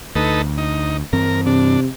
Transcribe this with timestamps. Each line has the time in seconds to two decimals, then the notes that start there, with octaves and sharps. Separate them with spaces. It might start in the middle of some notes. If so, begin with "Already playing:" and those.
0.15 D2 D#4 A4 B4
0.58 D#4
1.13 G2 E3 C4 A#4
1.46 C3 D4